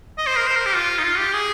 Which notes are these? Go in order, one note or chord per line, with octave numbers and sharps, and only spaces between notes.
D#5
C5
A#4
C5
A#4
G4
F4
D#4
F4
G4
G#4